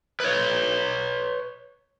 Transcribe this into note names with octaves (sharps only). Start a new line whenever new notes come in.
B4 C#5